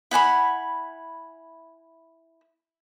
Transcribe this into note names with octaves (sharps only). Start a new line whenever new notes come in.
E4 F#5 G#5 B5